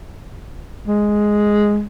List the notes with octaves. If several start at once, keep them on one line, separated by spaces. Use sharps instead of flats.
G#3